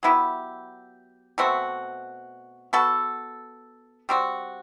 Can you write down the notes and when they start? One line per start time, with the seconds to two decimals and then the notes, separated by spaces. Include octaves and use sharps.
0.03 F#3 B3 E4 G4
1.38 B2 A3 C4 F#4
2.73 B3 F#4 A4
4.09 G3 C4 F#4